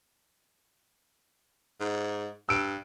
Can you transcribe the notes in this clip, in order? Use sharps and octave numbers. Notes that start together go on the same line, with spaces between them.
G#2
G2 E6 D7